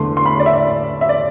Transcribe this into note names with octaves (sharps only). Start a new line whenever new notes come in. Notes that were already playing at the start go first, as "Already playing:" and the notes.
Already playing: E2 D3 A3 C6
C6
B5
D5
E5
E5
D5